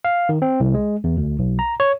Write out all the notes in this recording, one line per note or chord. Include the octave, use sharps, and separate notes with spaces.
F5
D#3
C4
C2
G#3
E2
D2
B1
A#5
C#5